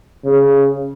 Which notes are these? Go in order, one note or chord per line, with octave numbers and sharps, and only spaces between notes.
C#3